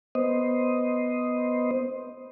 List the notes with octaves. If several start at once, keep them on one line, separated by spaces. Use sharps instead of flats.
B3 C5 D#5